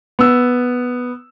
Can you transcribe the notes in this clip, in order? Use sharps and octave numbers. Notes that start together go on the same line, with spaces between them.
B3 E6